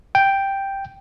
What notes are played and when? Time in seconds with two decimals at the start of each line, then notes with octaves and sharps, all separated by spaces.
0.15 G5